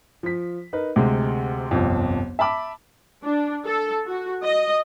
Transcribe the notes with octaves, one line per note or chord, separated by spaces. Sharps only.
F3 B6
D#4 A#4 B4
D2 C3 G#3 C4
G1 C2 F2
E5 A5 B5 D6
D4
A4
F#4
D#5